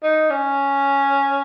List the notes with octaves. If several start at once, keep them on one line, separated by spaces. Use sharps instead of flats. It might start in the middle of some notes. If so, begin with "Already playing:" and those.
D#4
C#4